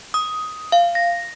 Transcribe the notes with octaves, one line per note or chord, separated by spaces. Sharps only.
D#6
F5
A#6